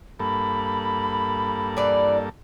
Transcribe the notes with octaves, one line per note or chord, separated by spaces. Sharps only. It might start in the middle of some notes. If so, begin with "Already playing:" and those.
G2 A#3 A4 B5
E3 D5